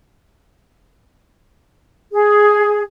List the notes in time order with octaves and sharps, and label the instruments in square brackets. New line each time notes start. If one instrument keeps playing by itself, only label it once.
[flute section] G#4